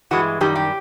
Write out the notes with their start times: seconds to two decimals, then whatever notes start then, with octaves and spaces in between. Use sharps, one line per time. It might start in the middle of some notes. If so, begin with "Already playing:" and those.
0.11 G2 E3 G#3 F#4
0.41 F#2 D#3 G3 G4
0.56 G4